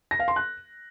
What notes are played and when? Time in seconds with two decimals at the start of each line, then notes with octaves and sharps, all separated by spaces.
0.11 A#6
0.19 F5
0.28 C6
0.36 F#6